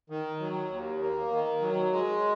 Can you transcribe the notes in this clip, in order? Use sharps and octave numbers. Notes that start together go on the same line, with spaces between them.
D#3
F#3
D#2
A#3
D#3
F#3
G#3